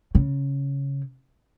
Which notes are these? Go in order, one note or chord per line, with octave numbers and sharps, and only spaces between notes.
C#3